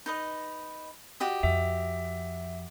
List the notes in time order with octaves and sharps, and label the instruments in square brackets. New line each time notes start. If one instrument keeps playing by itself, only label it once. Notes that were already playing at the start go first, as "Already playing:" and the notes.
[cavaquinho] D#4 B4 D#5
F#4 G4 D#5
[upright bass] F2 [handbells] E5